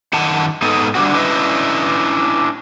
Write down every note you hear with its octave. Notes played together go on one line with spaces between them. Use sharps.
F#2 D#3 F#5 A5
G#2 B3 D#4 A4 D#5
D3 G3 D4 F#4
C#4 D4 E4 B4 D#5